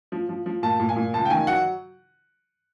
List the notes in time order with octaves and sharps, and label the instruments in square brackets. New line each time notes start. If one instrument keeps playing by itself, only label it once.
[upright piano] F3
F3
F3
A#2 A5
A#2
G#5
A#2
C#2 A5
G5
D#3 G#5
F#3 F#5